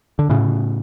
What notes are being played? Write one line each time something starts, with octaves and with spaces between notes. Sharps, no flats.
D3
A2 C#3